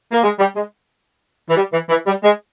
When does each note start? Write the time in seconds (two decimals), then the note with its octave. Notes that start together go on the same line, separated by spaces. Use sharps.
0.12 A#3
0.24 G#3
0.40 G3
0.56 G#3
1.49 E3
1.57 G3
1.73 E3
1.89 E3
2.07 G3
2.23 G#3